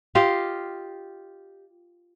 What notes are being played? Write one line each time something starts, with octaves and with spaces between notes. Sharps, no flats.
F4 G4 D#5 F5